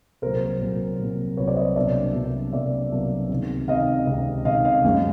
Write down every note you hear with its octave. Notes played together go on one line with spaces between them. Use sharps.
C2 A#2 F#3 A#4 C5
C2 A#2 F#3
C2 A#2 F#3
C2 A#2 F#3 B4 C#5
C5 D5
C#5 D#5
C2 B2 F#3 A#3 D4 D5 E5
C2 B2 F#3 A#3 D4
C2 B2 F#3 A#3 D4 D5 E5
C2 B2 F#3 A#3 D4
C#2 C3 D#3
C#2 C3 D#3 D#5 F5
C#2 C3 D#3
C#2 C3 D#3 D#5 F5
D#5 F5
F#2 C#3 F3 G#3